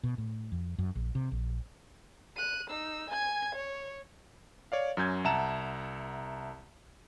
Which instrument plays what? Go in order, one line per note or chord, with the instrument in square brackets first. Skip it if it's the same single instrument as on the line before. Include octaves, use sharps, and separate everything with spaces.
[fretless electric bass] B2
A2
F2
F#2
A#1
C3
A#1
[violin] F#6 D#7
D#4 E6
G#5 G#6
C#5
[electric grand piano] C#5 D5 F5
F#2 F#3 C#4 G6 G#6
C2 E5 F#5 A5 A#5 E7